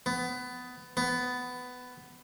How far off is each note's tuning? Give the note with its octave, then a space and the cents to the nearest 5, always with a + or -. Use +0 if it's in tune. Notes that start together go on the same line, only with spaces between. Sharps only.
B3 +20
B3 +15